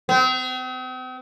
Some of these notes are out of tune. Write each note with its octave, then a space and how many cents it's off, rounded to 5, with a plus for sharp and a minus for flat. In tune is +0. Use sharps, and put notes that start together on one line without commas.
C4 -40